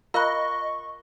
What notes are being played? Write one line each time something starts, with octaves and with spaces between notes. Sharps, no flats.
F4 A#4 D#5 F5 A#5 B5 C#6 F#6